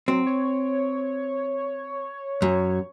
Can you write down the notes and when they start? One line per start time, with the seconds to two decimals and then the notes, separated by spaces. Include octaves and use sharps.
0.08 F#3 C4
0.27 C#5
2.42 F#2